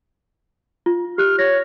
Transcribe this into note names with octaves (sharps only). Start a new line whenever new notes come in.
F4
G4 F6 F#6
C#5 A#6